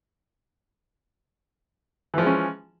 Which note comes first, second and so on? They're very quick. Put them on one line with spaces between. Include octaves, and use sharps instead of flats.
E3 F3 G#3 C#4